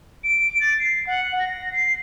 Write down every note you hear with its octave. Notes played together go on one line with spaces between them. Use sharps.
D7
A6
C7
F#5
A#6
C7